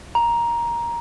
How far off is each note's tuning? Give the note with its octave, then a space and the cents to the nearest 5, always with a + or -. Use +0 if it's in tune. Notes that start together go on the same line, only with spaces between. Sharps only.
A#5 +10